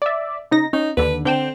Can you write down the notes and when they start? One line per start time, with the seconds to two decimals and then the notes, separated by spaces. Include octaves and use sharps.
0.02 D5 E5
0.51 C#3 D#4 A#6
0.73 C#4 D#4
0.97 D#2 D3 B4
1.25 D3 C4 G5 E7